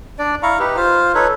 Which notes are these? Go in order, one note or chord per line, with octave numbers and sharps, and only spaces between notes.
D4 D5
E4 F5 A#5 C#6
D#4 G4 B4
F4 C5 F5
D#4 A4 B4 C#5